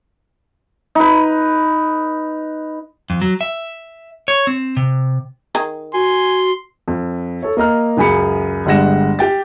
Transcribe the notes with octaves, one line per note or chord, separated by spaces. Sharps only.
D#4 B4
F2
F#3
E5
C#5
C4
C3
D#3 G#4 A#5
F#4 G#5 C6
F2
A4 C#5
A#3 D#5 A#5 F6
C#2 F#2 G#4 B5 C#7
G1 G3 G#3 F#5 A#6 E7
G4 G5 A6